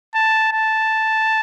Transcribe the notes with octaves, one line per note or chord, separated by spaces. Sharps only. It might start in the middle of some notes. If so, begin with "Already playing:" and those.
A5
A5